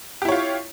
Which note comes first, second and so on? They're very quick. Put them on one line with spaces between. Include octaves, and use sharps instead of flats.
G4 E4 C#5 F4